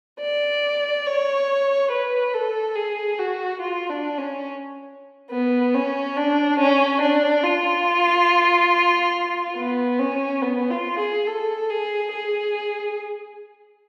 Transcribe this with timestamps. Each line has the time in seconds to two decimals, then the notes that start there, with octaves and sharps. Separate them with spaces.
0.21 D5
1.07 C#5
1.91 B4
2.34 A4
2.76 G#4
3.19 F#4
3.61 F4
3.90 D4
4.18 C#4
5.31 B3
5.75 C#4
6.17 D4
6.59 C#4
7.01 D4
7.43 F4
9.57 B3
9.99 C#4
10.42 B3
10.70 F4
10.99 G#4
11.27 A4
11.70 G#4
12.12 G#4